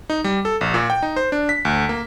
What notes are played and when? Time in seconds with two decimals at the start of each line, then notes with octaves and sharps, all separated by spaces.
0.10 D#4
0.24 G3
0.45 A4
0.61 A#1
0.74 A#2
0.90 G5
1.03 D#4
1.16 C5
1.32 D4
1.49 B6
1.65 D2
1.89 A#3